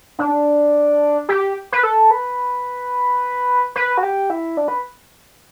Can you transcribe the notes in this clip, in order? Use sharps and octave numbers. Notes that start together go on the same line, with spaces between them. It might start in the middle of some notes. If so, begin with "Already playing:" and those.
D4
G4
B4
A4
B4
B4
F#4
G4
E4
D4
B4